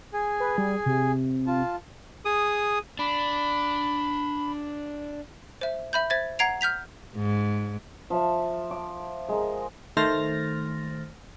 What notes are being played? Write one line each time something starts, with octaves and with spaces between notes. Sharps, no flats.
G#4 G#5
B4
G3
C3
F4 A5
G#4 D#6
D4 B5
C5 E5
E5 B5 G6
C5 E5 G#6 A6
F#5 A#5 G#6 C7 D7 F7
F6 G6 B6 F7
G#2
F3 E5 A5
D6
G#3 A#4
D#3 A3 C5 F6 A6 A#6